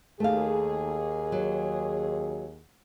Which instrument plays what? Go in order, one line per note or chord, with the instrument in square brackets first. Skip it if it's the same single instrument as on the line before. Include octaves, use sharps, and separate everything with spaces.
[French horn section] D#2 G#4 [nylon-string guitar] A3 F5
[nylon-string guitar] F#3